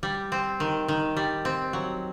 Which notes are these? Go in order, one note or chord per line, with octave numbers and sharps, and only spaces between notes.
G3
C4
D#3
D#3
G3
C4
F#3